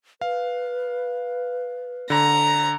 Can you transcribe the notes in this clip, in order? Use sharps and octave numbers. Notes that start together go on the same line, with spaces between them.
B4 F5
D3 A#5